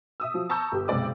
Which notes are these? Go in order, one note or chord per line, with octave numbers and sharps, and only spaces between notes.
E5 D#6 E6
F3 F#3
A5 A#5 C#6 E6 G6
G1 G4
F#1 B1 C3 G#3 D5 D6